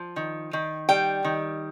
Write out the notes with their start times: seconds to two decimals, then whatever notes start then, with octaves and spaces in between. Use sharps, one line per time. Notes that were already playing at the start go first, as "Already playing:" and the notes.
Already playing: F3
0.16 D#3
0.53 D#3
0.89 G3 G5
1.24 D#3